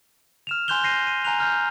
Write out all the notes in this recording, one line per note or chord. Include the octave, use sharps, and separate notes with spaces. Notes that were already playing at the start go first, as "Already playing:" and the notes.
F6 E7 F7
G#5 C6 F#6 G6 F7 G7
G6 A#6 C7 D#7
D#7
G#5 A#5 F#6 F7
F6 G6